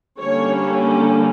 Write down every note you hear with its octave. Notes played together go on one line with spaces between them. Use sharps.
D3 G3 A#3 C#4 C#5